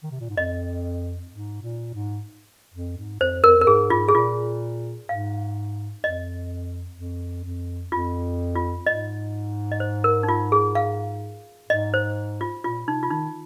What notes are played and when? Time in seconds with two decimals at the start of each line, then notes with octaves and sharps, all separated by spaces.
0.03 D#3
0.11 C3
0.20 A#2
0.29 G#2
0.37 F2 D#5
1.31 G#2
1.62 A#2
1.94 G#2
2.74 F2
2.97 G#2
3.20 F2 C5
3.44 F2 A#4
3.58 F2 A#4
3.67 G#2 G#4
3.90 G#2 F4
4.09 G#4
4.14 A#2 F4
5.08 G#2 F5
6.03 F2 D#5
6.97 F2
7.44 F2
7.92 F2 F4
8.56 F4
8.86 G#2 D#5
9.72 D#5
9.80 C5
10.04 A#4
10.23 D#4
10.28 F4
10.52 G#4
10.75 F5
11.69 G#2 D#5
11.94 C5
12.41 F4
12.64 A#2 F4
12.87 C3 D#4
13.03 F4
13.10 D#3 D#4